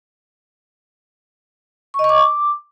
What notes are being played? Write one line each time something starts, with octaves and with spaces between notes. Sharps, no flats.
C#6
D#5
C#6
D6